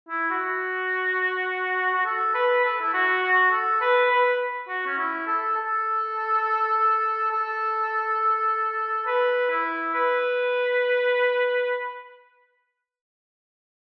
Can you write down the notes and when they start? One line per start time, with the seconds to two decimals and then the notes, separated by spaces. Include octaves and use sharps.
0.09 E4
0.31 F#4
1.94 F#4
2.05 A4
2.35 B4
2.65 A4
2.81 E4
2.94 F#4
3.23 F#4
3.51 A4
3.81 B4
4.11 B4
4.69 F#4
4.86 C#4
4.98 E4
5.27 A4
5.57 A4
7.31 A4
9.07 B4
9.50 E4
9.94 B4